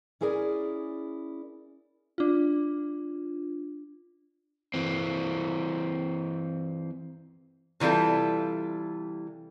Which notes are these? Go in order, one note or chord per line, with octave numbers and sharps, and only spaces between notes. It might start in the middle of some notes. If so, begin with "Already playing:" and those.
C#4 E4 G#4 A#4 D5
D4 F4
E3 C4
C3 E3 G3 F4 A4